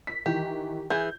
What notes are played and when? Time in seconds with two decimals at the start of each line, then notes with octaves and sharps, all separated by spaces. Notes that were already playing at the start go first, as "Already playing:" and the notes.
0.07 B6
0.26 D#3 E3 G4
0.90 E3 G#4 G6